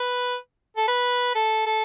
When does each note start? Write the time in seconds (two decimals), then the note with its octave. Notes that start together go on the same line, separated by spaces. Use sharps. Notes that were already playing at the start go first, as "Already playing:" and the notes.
Already playing: B4
0.76 A4
0.88 B4
1.35 A4
1.66 A4